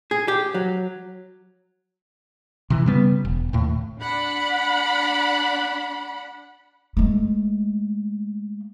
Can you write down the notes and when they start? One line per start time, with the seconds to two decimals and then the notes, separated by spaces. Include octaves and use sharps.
0.11 G#4
0.28 G4
0.54 F#3
2.70 C3 E3
2.86 C#3 G3 B3
3.25 E1
3.53 D#2 A2
4.02 D4 F#5 B5
6.97 G#3 A3